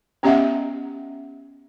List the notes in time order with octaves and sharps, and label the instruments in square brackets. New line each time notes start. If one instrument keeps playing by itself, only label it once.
[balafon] B3 C#4 G4 D#5 E5 F#5